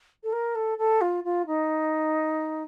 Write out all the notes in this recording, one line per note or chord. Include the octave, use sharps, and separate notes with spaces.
A4
A#4
A4
A4
F4
F4
D#4